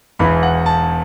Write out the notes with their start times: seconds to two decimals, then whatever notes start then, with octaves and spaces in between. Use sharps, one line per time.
0.19 E1 E2 E3 B5
0.43 F#5
0.66 A5